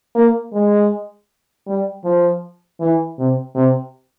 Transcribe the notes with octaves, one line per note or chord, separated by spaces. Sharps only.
A#3
G#3
G3
F3
E3
C3
C3